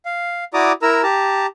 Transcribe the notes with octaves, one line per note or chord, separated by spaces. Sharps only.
F5
E4 F#4 D5 A#5 D6 D#6
E4 A#4 A#5 E6
G4 A5 A#5